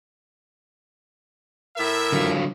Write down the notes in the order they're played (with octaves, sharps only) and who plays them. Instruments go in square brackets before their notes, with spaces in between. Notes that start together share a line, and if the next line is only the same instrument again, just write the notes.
[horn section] A2 A#4 E5
[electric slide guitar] D3 F#3 F4